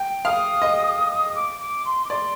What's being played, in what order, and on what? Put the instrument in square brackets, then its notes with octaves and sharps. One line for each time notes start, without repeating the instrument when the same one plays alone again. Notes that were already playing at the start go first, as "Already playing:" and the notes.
Already playing: [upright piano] G5
[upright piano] F5 [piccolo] D#6
[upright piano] D#5
[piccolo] D#6
D6
D6
C6
D6
[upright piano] D5 [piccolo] C6